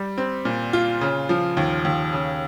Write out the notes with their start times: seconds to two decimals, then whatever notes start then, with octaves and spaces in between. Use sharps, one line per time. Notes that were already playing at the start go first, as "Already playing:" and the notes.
Already playing: G3
0.18 C4
0.45 A#2
0.73 F4
1.01 C#3
1.29 F3
1.57 D#2
1.85 D#2
2.13 C#3